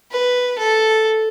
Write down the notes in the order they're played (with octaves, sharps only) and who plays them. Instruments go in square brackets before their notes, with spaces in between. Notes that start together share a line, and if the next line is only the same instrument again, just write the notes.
[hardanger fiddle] B4
A4